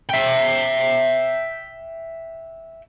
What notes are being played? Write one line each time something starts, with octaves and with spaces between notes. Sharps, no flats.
E5 G5